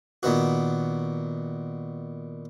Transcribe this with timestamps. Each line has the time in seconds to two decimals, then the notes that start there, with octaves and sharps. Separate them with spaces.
0.23 A#2 D#3 B3 F#4